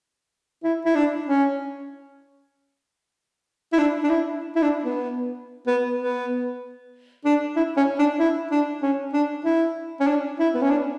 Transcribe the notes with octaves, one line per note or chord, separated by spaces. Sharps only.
E4
E4
D4
C#4
E4
D4
D4
E4
E4
D4
B3
B3
B3
D4
E4
C#4
D4
E4
D4
C#4
D4
E4
C#4
D4
E4
B3
C#4
D4